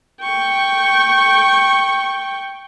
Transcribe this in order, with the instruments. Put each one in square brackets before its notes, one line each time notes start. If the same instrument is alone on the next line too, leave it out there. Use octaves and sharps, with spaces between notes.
[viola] G5 C#6